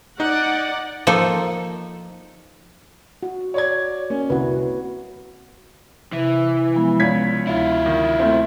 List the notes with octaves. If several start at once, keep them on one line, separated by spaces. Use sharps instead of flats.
D#4 D5 F#5
F3 A#3 D#4 A4
F#4
C#5 D5 G#6
A#3 C#4
C2 F#4 B4
C3 E3
F3 G#3 B3
C#2 C#5 D5 G#6 B6
D2 E4 F4
D#3
A3 C4